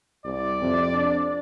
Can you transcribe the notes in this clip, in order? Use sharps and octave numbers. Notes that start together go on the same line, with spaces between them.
C2 D5
F2 C3
D4